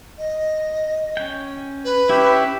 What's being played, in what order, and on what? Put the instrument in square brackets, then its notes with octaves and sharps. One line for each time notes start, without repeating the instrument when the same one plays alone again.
[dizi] D#5
[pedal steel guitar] C#4 G5
[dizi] B4
[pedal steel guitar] C#4 E4 [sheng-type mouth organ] G4 E5